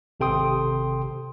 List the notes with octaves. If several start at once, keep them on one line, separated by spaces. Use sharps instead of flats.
G#1 C3 A4 G5 C6 D#6